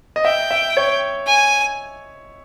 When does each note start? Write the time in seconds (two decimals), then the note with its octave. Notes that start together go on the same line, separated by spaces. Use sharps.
0.16 D#5
0.25 E5 G5
0.51 E5
0.77 C#5
1.27 G#5